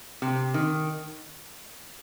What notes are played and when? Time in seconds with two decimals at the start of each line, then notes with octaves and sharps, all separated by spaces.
0.22 C3
0.54 D#3